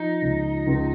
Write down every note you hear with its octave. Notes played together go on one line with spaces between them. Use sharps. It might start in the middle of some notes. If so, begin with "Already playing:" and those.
Already playing: F3 D#4
C#2
C#2